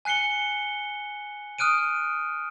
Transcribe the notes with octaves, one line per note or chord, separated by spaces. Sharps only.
G#5 F#6 C7 C#7 G7
D#6 F6 F#6 D7 D#7